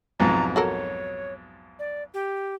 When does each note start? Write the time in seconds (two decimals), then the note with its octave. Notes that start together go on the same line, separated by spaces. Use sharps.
0.20 B1 F2 G#2 A#5
0.56 F#4 A4 A#4 C#5
1.79 D5
2.14 G4